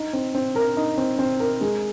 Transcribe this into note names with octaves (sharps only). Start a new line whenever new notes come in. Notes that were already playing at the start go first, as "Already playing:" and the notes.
Already playing: D#4
C4
C4
A#4
D#4
C4
C4
A#4
G#3